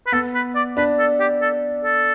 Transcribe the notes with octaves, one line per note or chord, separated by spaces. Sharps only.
B4
B3 A4
B4
D5
D4 B4
A4
G4
A4
A4